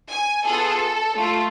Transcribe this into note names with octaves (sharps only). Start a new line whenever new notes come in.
G#5
B3 F4 G#4 A4
A3 F4 A4